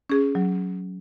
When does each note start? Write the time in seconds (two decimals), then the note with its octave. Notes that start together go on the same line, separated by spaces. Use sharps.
0.10 C#4 G#4
0.35 F#3